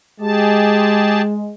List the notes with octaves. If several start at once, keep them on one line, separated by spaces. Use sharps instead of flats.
G#3 G4 G#4 A5